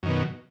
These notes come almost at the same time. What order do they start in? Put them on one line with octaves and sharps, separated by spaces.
F#2 D#3 B2